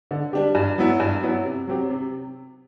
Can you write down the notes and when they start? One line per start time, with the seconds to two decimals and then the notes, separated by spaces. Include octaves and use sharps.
0.11 D3
0.33 G3 D4 G4
0.55 G2
0.78 F#3 B3 E4
1.00 G2
1.23 F#3 B3 E4
1.45 C3
1.67 F#3 C4 G4
1.90 C3